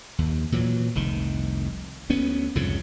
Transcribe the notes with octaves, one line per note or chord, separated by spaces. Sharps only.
D#2
A#2 E3 F#3
F1 C2 D#3
D2 B3 C#4
C2 F2 G#2 C#3